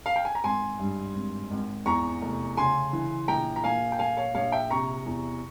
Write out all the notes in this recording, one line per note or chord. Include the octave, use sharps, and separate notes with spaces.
F5
G5
G#5
A#5
G#1 G#5 C6
G2
G#1
G#1
E2 A#5 C#6
F1
C#3 G#5 C6
E3
A#1 G5 A#5
A#5
A#2 F5 G#5
G5
A#1 F5 G#5
C#5 F5
A#1 C#5 F5
E5 G5
C3 A#5 C#6
E2